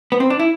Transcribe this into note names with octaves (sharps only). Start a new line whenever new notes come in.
B3
C4
D4
E4